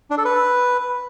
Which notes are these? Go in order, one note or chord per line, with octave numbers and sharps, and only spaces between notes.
D4
A4
B4